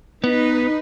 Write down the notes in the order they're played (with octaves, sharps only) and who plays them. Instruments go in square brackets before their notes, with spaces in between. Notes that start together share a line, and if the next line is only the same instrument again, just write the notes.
[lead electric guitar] B3 [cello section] D#4 B4